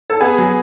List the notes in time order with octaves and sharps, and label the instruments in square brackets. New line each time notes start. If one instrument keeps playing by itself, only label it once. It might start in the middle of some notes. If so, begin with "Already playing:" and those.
[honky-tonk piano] A4
[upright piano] B3 [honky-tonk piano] G#4
[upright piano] F#3